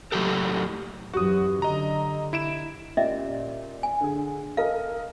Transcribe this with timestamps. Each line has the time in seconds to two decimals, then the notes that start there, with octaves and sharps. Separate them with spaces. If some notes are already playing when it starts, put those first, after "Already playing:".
0.12 A2 F#3 D#4 F#4 G4 A4
1.14 F#2 E3 F#3 F#4 G4 D#6
1.62 D3 D#5 A#5
2.33 E4 D7 E7
2.97 A#2 C#4 G4 D#5 E5
3.83 G#5
4.01 D3 G#4
4.57 A4 A#4 D#5 F5